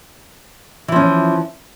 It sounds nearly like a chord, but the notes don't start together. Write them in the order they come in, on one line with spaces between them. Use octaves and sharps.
E3 F3 C#4